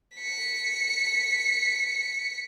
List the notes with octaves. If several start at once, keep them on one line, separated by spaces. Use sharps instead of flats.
B6 C#7